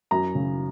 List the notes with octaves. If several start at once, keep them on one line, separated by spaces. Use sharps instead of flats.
F#2 A#5
C#3